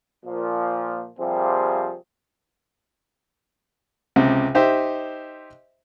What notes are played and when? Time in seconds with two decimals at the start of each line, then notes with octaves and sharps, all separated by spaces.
0.25 A#2 F3
1.19 C3 F3 G3 A#3 C4 G#4
4.16 C#2 C3
4.55 D#4 G4 C5 E5